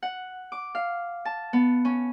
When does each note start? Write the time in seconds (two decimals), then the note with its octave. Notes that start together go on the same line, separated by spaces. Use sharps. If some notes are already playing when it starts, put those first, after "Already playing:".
0.03 F#5
0.52 D6
0.75 F5
1.25 A5
1.53 B3
1.85 C#4